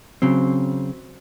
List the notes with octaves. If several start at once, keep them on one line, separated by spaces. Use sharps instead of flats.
C#3 F#3 C4